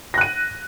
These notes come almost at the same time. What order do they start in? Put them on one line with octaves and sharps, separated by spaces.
A#6 F#6 D#7